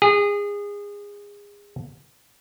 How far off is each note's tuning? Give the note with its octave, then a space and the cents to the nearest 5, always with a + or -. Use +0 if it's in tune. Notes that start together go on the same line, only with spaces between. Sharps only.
G#4 -25